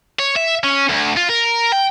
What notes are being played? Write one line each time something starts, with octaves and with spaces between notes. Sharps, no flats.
C#5
E5
C#4
D2
F4
A#4
G5